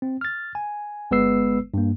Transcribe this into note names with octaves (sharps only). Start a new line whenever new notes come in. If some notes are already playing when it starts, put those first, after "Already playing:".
C4
F6 A6
G#5
G1 G#3 B3 B4 E6 C7
G2 A#3